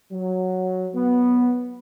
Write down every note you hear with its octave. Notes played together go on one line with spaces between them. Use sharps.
F#3
B3